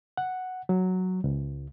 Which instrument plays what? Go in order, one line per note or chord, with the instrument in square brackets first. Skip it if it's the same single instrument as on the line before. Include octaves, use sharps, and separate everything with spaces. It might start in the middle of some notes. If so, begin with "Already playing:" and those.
[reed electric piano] F#5
F#3
C#2